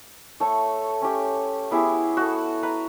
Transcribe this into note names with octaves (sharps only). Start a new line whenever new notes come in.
A3 A4 C#5
C#4 G4
B3 E4 G4 G#4
F#4 A4
B4 A#5